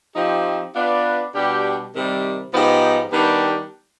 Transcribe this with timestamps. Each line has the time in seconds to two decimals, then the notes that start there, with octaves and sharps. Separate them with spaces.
0.16 F3 C4 D#4 G4
0.75 B3 D4 F4 B4 D5
1.34 B2 G3 D4 G4
1.93 C3 D#3 G3
2.52 G#2 F3 B3 D#4 G4
3.11 D#3 G3 B3 D4 G4